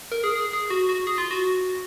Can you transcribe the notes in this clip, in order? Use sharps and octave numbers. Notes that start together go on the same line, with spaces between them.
A#4
G#4
G#4
G#4
F#4
F#4
G#4
F4
F#4